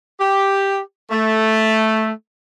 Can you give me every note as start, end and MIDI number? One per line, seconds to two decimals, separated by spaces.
0.20 0.79 67
1.11 2.09 57